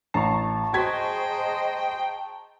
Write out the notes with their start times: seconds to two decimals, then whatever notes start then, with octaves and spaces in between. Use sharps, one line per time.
0.14 A1 A5 A#5 C#6 C7
0.73 F#4 G#4 C5 D#5 G5 G#6 B6